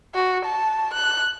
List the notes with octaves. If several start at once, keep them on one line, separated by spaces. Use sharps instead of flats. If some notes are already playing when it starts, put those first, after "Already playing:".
F#4
A5
F#6